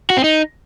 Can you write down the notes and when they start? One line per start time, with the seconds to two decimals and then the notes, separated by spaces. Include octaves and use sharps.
0.10 F#4
0.17 C4
0.24 D#4